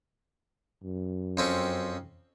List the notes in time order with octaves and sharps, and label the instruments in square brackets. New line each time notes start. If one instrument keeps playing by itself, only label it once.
[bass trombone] F#2
[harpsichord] F2 C4 C#4